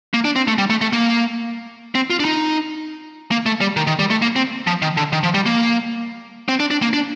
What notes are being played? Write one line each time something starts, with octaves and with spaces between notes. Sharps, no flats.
A#3
D4
C4
A3
G3
A3
A3
A#3
C4
F4
D4
D#4
A#3
A3
G3
D#3
D#3
G3
A3
A#3
C4
F3
D#3
D3
D#3
F3
G3
A#3
C4
D4
D4
A#3
D4